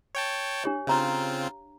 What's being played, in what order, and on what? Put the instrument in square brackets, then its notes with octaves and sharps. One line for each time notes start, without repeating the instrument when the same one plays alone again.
[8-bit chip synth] C#5 G5 A5
[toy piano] D4 G4 C#5
[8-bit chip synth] C#3 C4 F4 [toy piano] C#5 F5 A#5